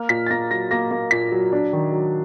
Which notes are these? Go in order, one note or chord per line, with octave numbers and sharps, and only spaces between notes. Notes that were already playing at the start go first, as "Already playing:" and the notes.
Already playing: A#3 F6
A#2 B6
A6
A#3 A#6
F#3 A#6
A#3 A#6
A#3
A#2 B6
F#3
D4
D#3
F#3